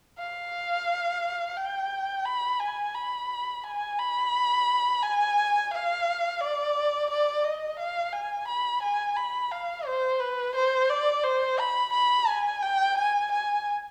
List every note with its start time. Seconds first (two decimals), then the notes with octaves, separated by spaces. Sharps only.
0.18 F5
1.57 G5
2.25 B5
2.60 G#5
2.95 B5
3.64 G#5
3.99 B5
5.02 G#5
5.71 F5
6.41 D5
7.10 D5
7.45 D#5
7.79 F5
8.13 G#5
8.48 B5
8.83 G#5
9.17 B5
9.52 F5
9.87 C5
10.20 B4
10.56 C5
10.90 D5
11.24 C5
11.59 B5
11.93 B5
12.28 G#5
12.63 G5
12.97 G#5
13.32 G#5